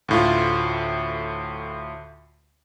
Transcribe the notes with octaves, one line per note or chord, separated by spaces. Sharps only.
D2 A2 F4